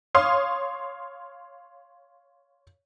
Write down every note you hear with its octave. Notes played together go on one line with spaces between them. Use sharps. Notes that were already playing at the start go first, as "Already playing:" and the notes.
C#5 F5 C6 D#6